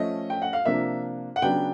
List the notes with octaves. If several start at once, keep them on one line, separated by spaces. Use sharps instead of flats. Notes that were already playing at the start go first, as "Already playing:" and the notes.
Already playing: F3 A3 C#4 D#5
G5
F#5
F5
C3 F3 A#3 D4 E5
F#5
C#3 F#3 B3 D4 G5